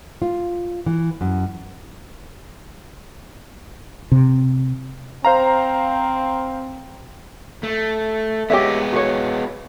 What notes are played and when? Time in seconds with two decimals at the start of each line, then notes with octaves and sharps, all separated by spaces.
0.22 F4
0.86 E3
1.21 F#2
4.12 C3
5.25 C4 C5 F5 A#5
7.63 A3
8.50 G#3 B3 G4 C#5 E5
8.92 F#4 C#5